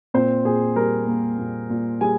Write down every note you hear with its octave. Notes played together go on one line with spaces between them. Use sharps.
A#2 C4 C5
A#2 G#4
G3 A#4
A#3
A#2
A#2
G3 G#4 G#5